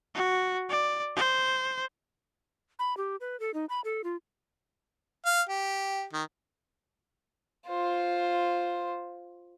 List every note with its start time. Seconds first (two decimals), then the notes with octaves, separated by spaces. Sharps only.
0.15 F#4
0.69 D5
1.16 C5
2.79 B5
2.97 G4
3.21 B4
3.40 A4
3.54 D#4
3.69 B5
3.84 A4
4.04 F4
5.25 F5
5.49 G4
6.13 D#3
7.67 F4 C5